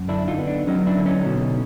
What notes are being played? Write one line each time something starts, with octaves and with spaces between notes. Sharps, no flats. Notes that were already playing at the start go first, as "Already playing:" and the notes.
Already playing: F#2
D3 D4 E4
D#4 F4
B3
D4
F#3 C#4 D#4
D4 E4
D3
C#4 D#4
B2